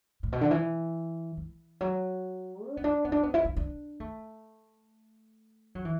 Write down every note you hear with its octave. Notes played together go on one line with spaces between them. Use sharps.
A2
B2
D3
E3
E3
F#3
D4
B3
D4
B3
D4
B3
E4
D4
D4
A3
F#3
E3